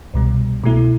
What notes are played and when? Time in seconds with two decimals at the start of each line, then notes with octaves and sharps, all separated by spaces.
0.14 C2 B2 G3
0.64 B2 A3 E4